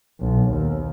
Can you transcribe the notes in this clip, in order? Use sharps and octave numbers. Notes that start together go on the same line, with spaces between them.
B1
D#2